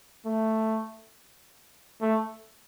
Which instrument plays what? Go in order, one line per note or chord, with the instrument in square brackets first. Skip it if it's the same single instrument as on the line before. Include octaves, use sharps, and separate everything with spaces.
[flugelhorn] A3
A3